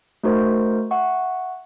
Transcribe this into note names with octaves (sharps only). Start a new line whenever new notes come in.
A3 D#4 F#4 A#4 C5
E5 F#5 C#6